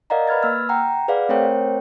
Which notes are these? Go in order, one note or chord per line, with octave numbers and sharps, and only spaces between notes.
A#4 D5 D#5 F5 F#5 A#5
B4 B5 F6 G#6 A6
A#3 E6 F6
F#5 G5 A#5
G#4 B4 D5 F5 F#5
A3 C4 A#4 C5 C#5 G5